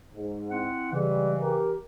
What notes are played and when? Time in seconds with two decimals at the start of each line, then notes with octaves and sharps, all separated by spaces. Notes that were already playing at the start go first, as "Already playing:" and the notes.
0.13 G#2
0.50 C4 E4 F#5
0.92 C#3 E3 G3 G#3
1.40 G4 A#4